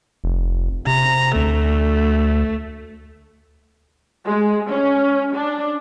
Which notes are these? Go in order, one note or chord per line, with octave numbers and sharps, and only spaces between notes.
F1
C3 A#5
D2 A3
G#3
C#4
D4